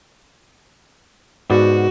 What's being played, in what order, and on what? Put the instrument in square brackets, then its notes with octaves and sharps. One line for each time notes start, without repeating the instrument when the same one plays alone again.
[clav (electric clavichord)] G#2 B3 D5 [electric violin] F#4